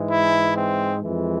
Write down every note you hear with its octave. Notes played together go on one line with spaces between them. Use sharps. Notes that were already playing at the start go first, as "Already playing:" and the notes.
Already playing: G#2 E3 G#3
E4
C4
F2 E3 G#3